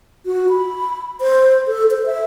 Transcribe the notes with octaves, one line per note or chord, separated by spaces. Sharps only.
F#4
B5
C5
A4
C5
E5